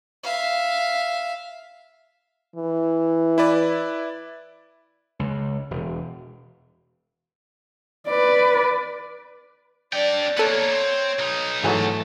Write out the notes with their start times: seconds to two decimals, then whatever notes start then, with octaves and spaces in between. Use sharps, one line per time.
0.23 E5 F5
2.56 E3
3.38 E4 B4 D5
5.19 C#2
5.71 E1
8.08 B4 D5
9.93 D4 D5 G5
10.37 A#3 B3 A4 C#5 F#6
10.73 C4
11.19 B1 D#4
11.64 G#2 E3 F#3 A3